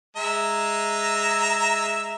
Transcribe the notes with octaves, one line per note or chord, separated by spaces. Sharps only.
G#3 E5 A#5